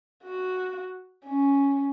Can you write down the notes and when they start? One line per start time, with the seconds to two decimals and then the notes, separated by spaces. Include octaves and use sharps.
0.24 F#4
1.26 C#4